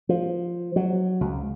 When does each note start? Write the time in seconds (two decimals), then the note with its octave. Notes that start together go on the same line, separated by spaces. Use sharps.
0.09 F3
0.76 F#3
1.21 C#2